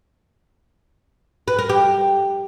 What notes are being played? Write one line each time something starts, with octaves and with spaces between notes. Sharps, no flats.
B4
A#4
G4